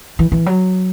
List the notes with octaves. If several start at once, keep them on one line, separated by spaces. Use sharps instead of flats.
E3
E3
F#3